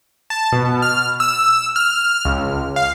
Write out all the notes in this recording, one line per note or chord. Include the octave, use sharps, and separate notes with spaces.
A5
B2
F6
E6
F6
C#2
F5